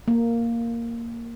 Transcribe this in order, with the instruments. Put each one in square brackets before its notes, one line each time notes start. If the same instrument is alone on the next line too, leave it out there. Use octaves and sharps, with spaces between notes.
[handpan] A#3